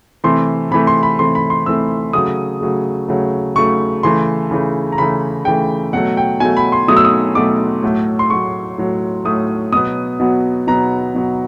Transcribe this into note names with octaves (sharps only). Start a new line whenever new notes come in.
C3 E3 A3 C6
C3 E3 A3 B5
C6
B5
C3 E3 A3 C6
B5
C6
C3 E3 A3 E6
C#3 F#3 A3 D#6
C#3 F#3 A3
C#3 F#3 A3
C#3 F#3 A3 C#6
C#3 E3 A3 C6
C#3 E3 A3
A#5
C#3 E3 A3 B5
C#3 E3 A3 G5
B2 F#3 A3 F#5
G5
B2 F#3 A3 G#5
B5
C6
B2 F#3 A3 D#6
E6
D#6
B2 F#3 A3 D6
A2 F#3 A3
C6
A2 F#3 A3 C#6
A2 F#3 A3
A2 F#3 A3 D#6
B2 F#3 B3 D#6
B2 F#3 B3
B2 F#3 B3 A#5
B2 F#3 B3